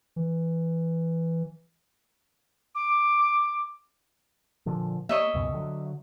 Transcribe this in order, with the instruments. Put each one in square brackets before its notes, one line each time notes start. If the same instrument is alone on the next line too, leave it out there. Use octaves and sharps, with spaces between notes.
[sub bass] E3
[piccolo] D6
[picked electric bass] A#2 D3 F3
[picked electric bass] A#3 [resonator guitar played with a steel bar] C#5 D#5 E5
[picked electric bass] C#2 F#2 B2
D3 E3 F#3